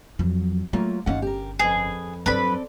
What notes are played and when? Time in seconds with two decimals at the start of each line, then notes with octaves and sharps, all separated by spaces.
0.19 F2 F#3
0.73 F#3 A3 A#3 F4
1.06 G1 D#2 C#4 F5 F#5
1.22 G4 A#4
1.59 F2 G#4 B4
2.26 G2 F#3 C4 A4 B4 D5 B5